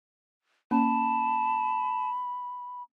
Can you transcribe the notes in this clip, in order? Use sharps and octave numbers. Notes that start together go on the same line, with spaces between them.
A#3 C#4 A5 B5